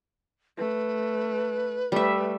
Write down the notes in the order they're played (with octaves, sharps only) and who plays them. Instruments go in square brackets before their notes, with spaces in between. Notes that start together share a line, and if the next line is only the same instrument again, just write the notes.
[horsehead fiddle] A3 [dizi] B4
[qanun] G3 E5 [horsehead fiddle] A3